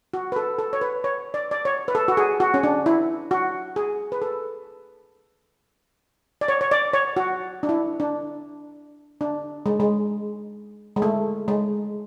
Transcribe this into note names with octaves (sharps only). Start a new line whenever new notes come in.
F#4
B4
A4
A4
C#5
B4
C#5
D5
D5
C#5
B4
A4
F#4
G#4
F#4
C#4
D4
E4
F#4
G#4
B4
A4
D5
C#5
C#5
D5
C#5
F#4
D4
E4
D4
D4
G#3
G#3
G#3
A3
G#3